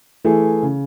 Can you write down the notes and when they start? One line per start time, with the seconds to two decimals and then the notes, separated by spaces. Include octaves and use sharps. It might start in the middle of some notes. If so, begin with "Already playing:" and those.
0.24 E3 A3 E4 G#4
0.63 C#3